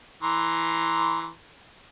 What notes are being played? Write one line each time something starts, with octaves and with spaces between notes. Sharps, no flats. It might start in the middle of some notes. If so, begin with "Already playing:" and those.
E3 A#5 C6